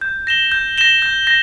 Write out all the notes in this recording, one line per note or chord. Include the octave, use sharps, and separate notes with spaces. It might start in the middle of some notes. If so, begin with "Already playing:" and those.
G6
A#6 E7 G7
G6
A#6 E7 G7
G6
A#6